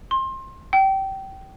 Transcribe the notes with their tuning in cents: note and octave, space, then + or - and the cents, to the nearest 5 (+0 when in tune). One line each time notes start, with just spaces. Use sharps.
C6 +25
G5 -20